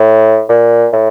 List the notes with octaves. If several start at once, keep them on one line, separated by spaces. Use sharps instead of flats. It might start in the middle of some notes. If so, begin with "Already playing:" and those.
Already playing: A2
A#2
A2